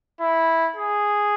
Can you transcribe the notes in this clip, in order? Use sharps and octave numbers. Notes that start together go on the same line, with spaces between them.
E4
G#4